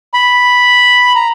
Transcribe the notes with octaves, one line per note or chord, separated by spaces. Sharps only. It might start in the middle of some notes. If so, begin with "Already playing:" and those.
B5
A#5